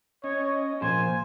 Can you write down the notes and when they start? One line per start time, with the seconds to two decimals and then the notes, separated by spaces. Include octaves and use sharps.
0.24 C#4 C#5 D#5
0.82 A#2 F3 C5 G#5